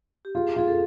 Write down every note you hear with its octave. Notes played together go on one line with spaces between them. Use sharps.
G4
F4 G#4
F4 G#4
A4